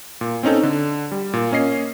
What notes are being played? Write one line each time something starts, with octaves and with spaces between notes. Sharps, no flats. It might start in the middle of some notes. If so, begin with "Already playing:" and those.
A#2
C4 C#4 D#4 A4
D3
G3
A#2
A#3 C#4 D#5 C7